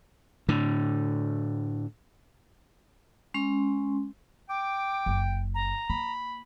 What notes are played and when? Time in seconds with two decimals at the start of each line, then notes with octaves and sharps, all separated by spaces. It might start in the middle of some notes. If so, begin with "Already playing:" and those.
0.49 A2 D3
3.34 G#3 C#4 C6
4.49 G5 D6
5.06 F#1
5.55 A#5
5.90 A#3 B5